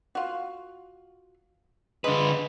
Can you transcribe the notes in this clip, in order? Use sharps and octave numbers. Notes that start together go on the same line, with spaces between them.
F4 F#4
D3 G#3 D4 B4